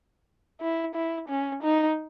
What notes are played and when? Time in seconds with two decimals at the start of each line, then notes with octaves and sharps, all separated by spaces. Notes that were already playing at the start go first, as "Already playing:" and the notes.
0.60 E4
0.94 E4
1.28 C#4
1.62 D#4